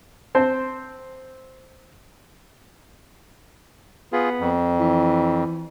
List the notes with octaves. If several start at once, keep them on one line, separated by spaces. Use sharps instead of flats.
C4 C5 A5
B3 F4 G#4
F2
E3